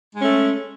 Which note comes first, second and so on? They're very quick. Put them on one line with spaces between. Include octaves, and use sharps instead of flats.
G#3 C#4 A3